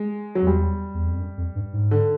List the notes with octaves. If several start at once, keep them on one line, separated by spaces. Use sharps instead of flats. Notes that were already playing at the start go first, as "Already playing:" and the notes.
Already playing: G#3
F#3
F2
E2 G3
E2
F2
F#2
F2
G2
G#2
D3